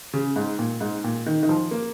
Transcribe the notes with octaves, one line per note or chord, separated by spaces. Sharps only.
C#3
G#2
A#2
G#2
A#2
D#3
D#3
F3
A#3